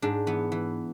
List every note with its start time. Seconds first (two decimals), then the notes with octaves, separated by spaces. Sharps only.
0.02 G#2 D4
0.27 E3 B3
0.52 E3